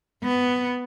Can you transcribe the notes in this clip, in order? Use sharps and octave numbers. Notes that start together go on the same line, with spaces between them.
B3